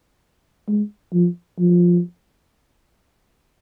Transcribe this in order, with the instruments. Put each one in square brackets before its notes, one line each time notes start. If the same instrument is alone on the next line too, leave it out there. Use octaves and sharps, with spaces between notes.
[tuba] G#3
F3
F3